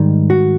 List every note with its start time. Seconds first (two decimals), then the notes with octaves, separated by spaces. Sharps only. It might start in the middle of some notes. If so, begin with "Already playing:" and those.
Already playing: G#2 D#3 G3
0.30 F#4